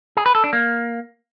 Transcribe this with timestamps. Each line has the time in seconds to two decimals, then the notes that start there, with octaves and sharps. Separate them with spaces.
0.17 G#4
0.26 B4
0.35 A4
0.44 D4
0.53 A#3